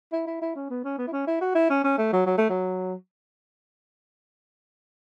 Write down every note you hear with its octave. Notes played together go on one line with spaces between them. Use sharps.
E4
E4
E4
C#4
B3
C#4
B3
E4
C#4
E4
F#4
E4
C#4
C#4
A3
F#3
F#3
A3
F#3